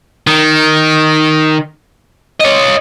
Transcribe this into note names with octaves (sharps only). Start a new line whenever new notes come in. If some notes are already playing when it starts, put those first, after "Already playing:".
D#3
C#5 D#5